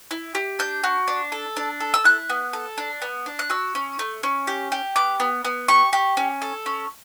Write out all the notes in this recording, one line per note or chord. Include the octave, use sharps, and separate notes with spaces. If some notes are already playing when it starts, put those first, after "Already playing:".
E4
G4
D4 G6
F#4
D4
A4
D4
A4
E6
E4 F#6
B3
A4
D4
B3
D4
F#6
F#4 E6
C#4
A3
C#4
G4
G4
B3 D6
B3
B3
G4 C#6
G4
C#4
A4
C#4